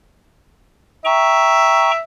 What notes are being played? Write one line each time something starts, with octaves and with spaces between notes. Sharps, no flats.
E5 G5 A#5 C#6